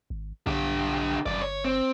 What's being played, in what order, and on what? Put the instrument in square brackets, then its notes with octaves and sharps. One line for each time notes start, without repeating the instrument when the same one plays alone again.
[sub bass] G#1
[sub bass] B1 [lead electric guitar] D3 G4
[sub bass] G1 [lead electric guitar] F#2 D5
[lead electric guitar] C#5
C4